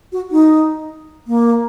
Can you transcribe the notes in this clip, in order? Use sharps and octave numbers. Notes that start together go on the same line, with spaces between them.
F#4
D#4
A#3